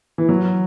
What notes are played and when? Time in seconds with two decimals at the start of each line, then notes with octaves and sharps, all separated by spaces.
0.18 E3
0.29 F#3